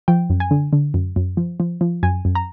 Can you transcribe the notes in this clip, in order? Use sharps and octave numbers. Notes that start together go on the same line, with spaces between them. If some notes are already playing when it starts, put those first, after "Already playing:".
F3 G5
F#2
G#5
D3
D3
F#2
F#2
F3
F3
F3
F#2 G#5
F#2
A#5